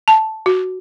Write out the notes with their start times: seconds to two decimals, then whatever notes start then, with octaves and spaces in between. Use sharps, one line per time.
0.08 A5
0.46 F#4